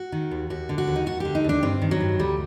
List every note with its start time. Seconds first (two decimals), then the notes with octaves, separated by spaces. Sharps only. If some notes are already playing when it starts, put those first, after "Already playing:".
Already playing: F#4
0.12 D#3
0.31 D#2
0.50 D#2 F#4
0.69 D3
0.78 F#4
0.87 D#2
0.95 D#4
1.06 D#2 F#4
1.20 D3 G4
1.35 D#4
1.44 D#2 D4
1.63 G2 C4
1.82 D#3
1.91 F#3
2.00 G2
2.19 D2 G3